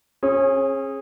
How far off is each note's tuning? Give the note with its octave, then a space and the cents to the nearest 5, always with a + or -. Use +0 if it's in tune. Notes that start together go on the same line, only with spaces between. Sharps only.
C#4 -35 G#4 +0